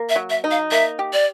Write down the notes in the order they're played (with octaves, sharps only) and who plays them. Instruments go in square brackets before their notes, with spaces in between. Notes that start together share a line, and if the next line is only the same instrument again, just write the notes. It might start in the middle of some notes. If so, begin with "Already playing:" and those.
Already playing: [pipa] A#3
[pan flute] E5
[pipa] F#3
[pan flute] E5
[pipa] D#4
[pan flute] F5
[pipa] A#3 [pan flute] E5
[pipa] G4
[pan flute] D5